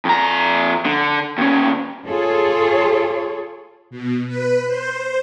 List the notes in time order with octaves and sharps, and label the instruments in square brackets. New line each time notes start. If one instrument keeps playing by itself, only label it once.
[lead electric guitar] F2 A#5
D3
D#2 C#4
[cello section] F4 G#4 A4 C#5
[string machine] B2
B4
C5